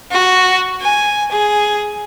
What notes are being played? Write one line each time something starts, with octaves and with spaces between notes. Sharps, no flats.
F#4
G#5
G#4